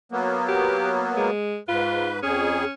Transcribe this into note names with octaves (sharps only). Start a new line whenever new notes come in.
F#3 A#3 B3
G4
G#3
G#2 F4 B4
F2 C#4 G#4